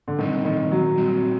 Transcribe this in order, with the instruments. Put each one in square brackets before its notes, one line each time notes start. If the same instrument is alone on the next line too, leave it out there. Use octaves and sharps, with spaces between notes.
[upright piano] D3
[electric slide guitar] A#2 G3 C4 [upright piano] D#3
[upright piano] D#3
F#3
[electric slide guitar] A#2 G3 C4